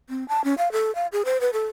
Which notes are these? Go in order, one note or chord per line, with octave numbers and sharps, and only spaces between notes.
C4
A5
C#4
F5
A4
F5
G#4
C5
B4
A4